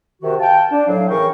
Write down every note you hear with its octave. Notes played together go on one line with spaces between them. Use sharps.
C3 D#3 F#4
F5 G5 A5
D4
A2 F#3 F5
E2 C#3 E3 A#4 G5 C#6